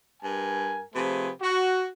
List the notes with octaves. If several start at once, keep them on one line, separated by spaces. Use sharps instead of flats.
G2 A#4 G#5
C3 F3 A3 G#4 B4
F#4